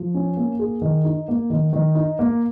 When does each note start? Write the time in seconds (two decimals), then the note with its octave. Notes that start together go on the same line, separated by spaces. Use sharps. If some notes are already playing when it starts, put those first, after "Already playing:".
Already playing: F3
0.14 C#4
0.37 A#3
0.59 G#4
0.82 D#3
1.05 D#4
1.28 A#3
1.50 D#3
1.73 D#3
1.95 D#4
2.19 A#3